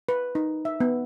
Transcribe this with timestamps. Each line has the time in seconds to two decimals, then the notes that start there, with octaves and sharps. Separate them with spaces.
0.09 B4
0.35 D#4
0.65 E5
0.80 B3